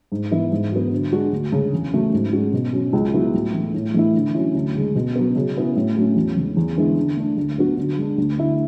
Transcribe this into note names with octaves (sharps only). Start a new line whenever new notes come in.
G#2
E3 B3 E4
G#2
F#3 B3
D3
G#3 D4 F#4
D2
C#3 G#3
E2
C#3 F#3 A3
G#2
G#3 C#4 F#4
B2
F#3 C#4
C#2
C#3 F#3 B3 E4
A2
E3 A3
A2
E3 A3 E4
D3
F#3 C#4 E4
D2
C#3 G#3
B2
F#3 B3
C#3
F#3 B3 E4
A2
F#3 A3 C#4
E2
C#3 E3 G#3
E2
D3 G#3 B3 E4
D3
A3 D4
D2
D3 F#3 B3 F#4
D3
G#3 D4
D2
D3 A3 E4